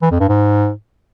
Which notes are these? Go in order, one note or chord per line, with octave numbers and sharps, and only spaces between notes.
E3
F2
G2
G#2